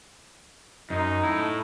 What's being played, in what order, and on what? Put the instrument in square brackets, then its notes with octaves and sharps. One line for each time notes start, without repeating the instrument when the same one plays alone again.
[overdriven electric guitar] F#2 [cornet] D#4
[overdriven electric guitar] A2 E4